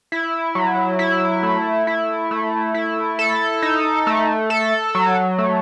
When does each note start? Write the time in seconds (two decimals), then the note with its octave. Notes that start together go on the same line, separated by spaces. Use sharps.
0.12 E4
0.55 F#3
0.99 E4
1.43 A3
1.87 E4
2.31 A3
2.74 E4
3.19 A4
3.62 D#4
4.07 A3
4.50 A4
4.95 F#3
5.38 A3